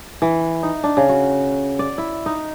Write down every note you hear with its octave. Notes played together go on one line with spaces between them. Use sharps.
E3
D#4
D4
C#3
F#4
D5
E4
D#4